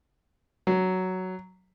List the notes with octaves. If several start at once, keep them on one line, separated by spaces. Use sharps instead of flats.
F#3